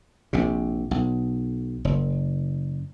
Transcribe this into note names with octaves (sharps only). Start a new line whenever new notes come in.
A#1 C3
B1
F#1